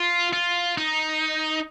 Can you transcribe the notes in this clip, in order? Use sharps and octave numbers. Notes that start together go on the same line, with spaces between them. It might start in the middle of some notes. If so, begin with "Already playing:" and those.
Already playing: F4
F4
D#4